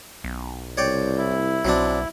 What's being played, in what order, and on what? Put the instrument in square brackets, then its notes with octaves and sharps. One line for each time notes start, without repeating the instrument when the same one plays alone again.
[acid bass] B1
[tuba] C2 [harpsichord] C#5 D5 G5
[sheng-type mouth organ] E4
[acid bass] B1 [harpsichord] F#3 C4 D4